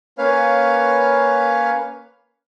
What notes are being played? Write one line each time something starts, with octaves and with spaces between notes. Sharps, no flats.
A#3 C#4 B4 C#5 F5 F6